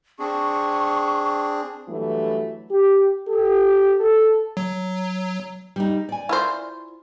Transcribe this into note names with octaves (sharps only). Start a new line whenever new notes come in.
C4 D4 G#4 C#6
G2 E3 F#3 A3
G4
G4 A4
A4
F#3
G3 D#4
D5 G#5
E4 F4 C5